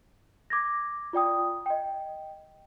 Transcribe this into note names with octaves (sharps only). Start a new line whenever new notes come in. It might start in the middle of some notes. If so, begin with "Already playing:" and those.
D6 G#6 A#6
F4 D5 G5 D#6
D#5 G5